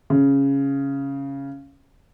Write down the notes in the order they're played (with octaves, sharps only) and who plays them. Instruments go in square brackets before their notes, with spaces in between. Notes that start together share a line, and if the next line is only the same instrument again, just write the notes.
[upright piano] C#3